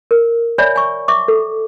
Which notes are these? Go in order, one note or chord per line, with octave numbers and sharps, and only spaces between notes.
A#4
C#5 D5 E5 G#5 B5
G#5 C#6
E5 C#6 D6
A4